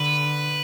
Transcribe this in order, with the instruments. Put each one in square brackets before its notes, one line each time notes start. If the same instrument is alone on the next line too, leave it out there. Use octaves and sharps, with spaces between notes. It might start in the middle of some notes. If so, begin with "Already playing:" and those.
Already playing: [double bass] D3 [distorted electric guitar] B4